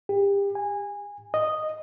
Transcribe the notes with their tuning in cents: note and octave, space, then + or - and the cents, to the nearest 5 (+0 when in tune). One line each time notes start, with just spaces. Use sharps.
G4 +30
G#5 -20
D#5 -5